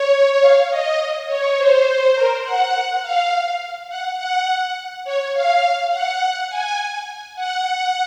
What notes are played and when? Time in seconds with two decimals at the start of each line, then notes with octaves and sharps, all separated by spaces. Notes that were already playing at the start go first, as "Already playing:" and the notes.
Already playing: C#5
0.41 F5
0.70 D#5
1.28 C#5
1.57 C5
2.15 A#4
2.44 F#5
2.73 F#5
3.02 F5
3.89 F#5
4.18 F#5
5.05 C#5
5.34 F5
5.91 F#5
6.21 F#5
6.49 G#5
7.36 F#5